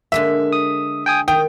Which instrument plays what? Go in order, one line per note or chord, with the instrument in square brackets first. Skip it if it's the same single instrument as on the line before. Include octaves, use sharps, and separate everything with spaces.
[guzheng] D3 G#3 A#3 [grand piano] E5
[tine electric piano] D#6
G5 G#5 D#6
[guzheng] D#3 [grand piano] G5 [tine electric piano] D#6